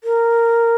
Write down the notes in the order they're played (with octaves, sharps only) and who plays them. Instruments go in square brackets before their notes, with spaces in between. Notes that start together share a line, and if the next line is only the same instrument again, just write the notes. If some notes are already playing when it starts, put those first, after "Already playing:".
[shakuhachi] A#4